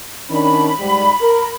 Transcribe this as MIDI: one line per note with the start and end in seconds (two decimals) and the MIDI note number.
0.30 0.70 51
0.30 0.70 61
0.30 0.70 62
0.30 1.55 83
0.79 1.09 44
0.79 1.09 55
1.21 1.51 70